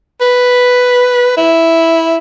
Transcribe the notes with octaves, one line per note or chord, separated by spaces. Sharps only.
B4
E4